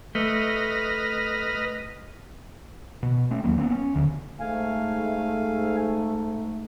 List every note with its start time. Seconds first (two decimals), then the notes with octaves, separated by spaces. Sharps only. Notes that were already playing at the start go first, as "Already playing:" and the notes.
0.15 A3 B4 D#5 F6
3.03 B2
3.31 A3 C#4
3.44 D#2 D#3 F#3 A#3
3.57 F#3 A#3 B3 C#4
3.71 C#4
3.94 D#1 D2 D3 F#3
4.40 G#2 A3 F5 G#5